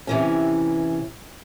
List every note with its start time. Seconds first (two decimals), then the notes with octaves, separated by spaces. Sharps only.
0.07 C3 E3 C#4